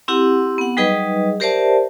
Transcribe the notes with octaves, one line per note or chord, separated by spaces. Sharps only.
C4 E4 G4 F#5
B3 F#5
F#3 G3 D#4 G#4 B4 D#5
G4 A#4 C5 D5 E5 A5